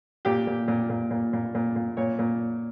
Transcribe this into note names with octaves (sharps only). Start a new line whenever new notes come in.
A#2 G4
A#2
A#2
A#2
A#2
A#2
A#2
A#2
A#2 C#5
A#2